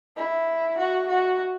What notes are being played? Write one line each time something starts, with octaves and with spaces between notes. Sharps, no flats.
E4
F#4
F#4